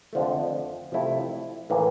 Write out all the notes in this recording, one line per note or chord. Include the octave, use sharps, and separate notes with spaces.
F2 D3 F3 A3
C3 F3 A3 E4
A2 E3 A#3